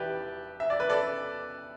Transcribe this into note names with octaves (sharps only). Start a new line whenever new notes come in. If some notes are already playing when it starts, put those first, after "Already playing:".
Already playing: E1 E3 G4 B4 D5 E5
E5
D5
B4
A4 D5